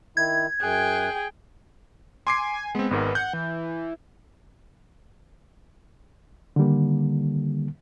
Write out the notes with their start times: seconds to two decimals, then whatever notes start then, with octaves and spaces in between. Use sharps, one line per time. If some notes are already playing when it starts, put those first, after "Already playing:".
0.17 D#3 E4 G#6
0.61 F#2 G#4 G5 F#6
2.27 G#5 C6 D6 C7
2.75 G#3 B3 C4
2.91 G#1 G#2 A#4
3.15 F#5 G6
3.34 E3
6.56 D3 D#3 G3 A#3